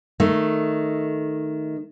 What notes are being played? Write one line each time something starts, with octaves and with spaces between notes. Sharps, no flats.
D#3 A3